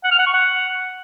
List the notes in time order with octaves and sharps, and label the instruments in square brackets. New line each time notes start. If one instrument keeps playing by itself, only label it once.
[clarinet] F#5
F6
F#5
C#6
F#5